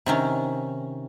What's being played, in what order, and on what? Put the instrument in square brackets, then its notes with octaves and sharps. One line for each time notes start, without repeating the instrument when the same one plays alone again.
[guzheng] C3 D#3 C#4